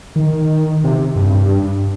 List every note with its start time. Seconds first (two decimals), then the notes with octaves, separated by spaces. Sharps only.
0.16 D#3
0.84 C3
1.16 G2